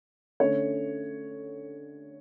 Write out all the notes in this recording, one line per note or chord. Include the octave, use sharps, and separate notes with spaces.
D3 A3 C#4 C#5